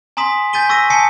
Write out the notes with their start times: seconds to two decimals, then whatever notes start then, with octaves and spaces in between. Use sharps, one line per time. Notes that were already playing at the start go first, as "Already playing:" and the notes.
0.17 G#5 A#5 C6 D#6 B6
0.53 G#5 G6 A6 B6 D#7 G7
0.69 C#6 E6 A#6 B6 D#7
0.90 G#5 A5 D#6 C7 C#7